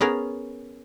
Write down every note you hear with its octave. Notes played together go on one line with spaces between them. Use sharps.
B3 C#4 G#4 A#4